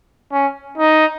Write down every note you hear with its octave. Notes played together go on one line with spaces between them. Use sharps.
C#4
D#4